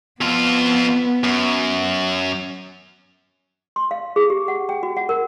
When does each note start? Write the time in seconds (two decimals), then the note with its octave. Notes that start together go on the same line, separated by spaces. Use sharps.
0.21 F2 B3 F4
1.24 F#2
3.76 C6
3.91 F5
4.16 G#4
4.30 G4
4.48 F#5
4.69 G5
4.83 F#4
4.97 F#5
5.09 A#4